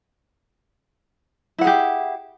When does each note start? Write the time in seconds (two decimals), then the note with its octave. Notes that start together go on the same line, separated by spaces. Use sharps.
1.59 E4
1.61 F#5
1.64 G#4
1.67 G4